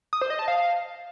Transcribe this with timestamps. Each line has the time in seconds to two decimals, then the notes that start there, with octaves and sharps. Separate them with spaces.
0.13 D#6
0.21 C5
0.30 D#5
0.39 A5
0.48 F5